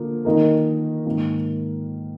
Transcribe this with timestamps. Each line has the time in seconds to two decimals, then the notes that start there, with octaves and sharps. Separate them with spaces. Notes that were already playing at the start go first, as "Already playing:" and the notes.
Already playing: D3 F3 A#3
0.25 D#3 A#3 D#4 A#4
1.06 G#2 D#3 A#3